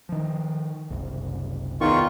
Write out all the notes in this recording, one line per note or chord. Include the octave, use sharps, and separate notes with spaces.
D#3 F3
F#1 C2
E2 D#3 B3 D#4 F4 C#6